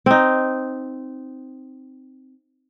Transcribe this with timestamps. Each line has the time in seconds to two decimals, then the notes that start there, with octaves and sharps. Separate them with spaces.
0.06 C4 D#4